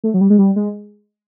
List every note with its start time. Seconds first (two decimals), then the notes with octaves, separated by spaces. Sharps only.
0.04 A3
0.14 F#3
0.21 G3
0.30 G#3
0.39 G3
0.56 G#3